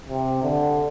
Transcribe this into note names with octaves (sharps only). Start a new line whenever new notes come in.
C3
D3